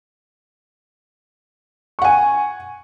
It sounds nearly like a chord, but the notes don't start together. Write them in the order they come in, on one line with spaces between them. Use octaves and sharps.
C#6 F#5 G#5